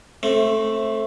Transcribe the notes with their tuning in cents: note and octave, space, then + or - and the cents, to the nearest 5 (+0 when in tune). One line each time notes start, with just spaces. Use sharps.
A3 +0 C4 +25